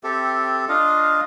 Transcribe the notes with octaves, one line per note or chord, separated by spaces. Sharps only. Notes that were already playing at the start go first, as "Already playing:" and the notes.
C4 G4 A4 E5
D4 F4 D#5 F5